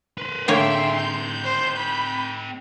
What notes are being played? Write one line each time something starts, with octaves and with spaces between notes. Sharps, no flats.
B4 C5
D3 A#3 C4 G#4 C#5 E5 G5 C6
G6
C5
B5